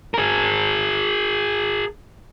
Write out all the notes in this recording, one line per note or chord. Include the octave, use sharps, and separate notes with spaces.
G#4 A#4